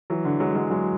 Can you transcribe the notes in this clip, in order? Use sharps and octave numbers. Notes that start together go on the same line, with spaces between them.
E3 F#3
D3
F#3 G#3
F#3 G#3
F#3 G#3